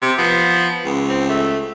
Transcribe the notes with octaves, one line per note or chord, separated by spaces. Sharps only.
C3
F3 B3
C#2
C4
A3